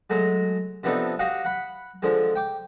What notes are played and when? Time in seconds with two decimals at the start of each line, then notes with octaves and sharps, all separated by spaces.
0.10 F#3 G#3 A3 A#5
0.83 C3 F3 B3 D4 D#4 A4
1.19 F#4 G4 D#5 F5 F#5
1.45 F#5 B5
2.02 D3 F3 G#3
2.36 G5 D6